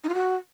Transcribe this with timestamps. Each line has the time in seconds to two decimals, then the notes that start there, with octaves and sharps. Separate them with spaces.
0.04 D#4
0.09 F4
0.14 F#4